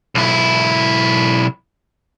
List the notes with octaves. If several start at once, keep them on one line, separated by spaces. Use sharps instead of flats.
B1 E4